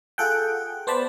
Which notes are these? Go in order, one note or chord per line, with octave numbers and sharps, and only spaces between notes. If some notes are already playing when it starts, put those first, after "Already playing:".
F4 G#4 A4 F#5 G5
B3 C5 D5 A5 B5